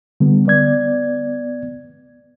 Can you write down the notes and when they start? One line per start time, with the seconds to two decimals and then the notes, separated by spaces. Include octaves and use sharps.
0.20 D3 G3 B3
0.47 B3 D5 G#6